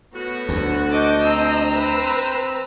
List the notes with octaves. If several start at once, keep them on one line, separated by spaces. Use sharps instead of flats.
A2 A3 B3 F#4
D2
D4 D#5 D6 G6
C4 A#5 E6
B4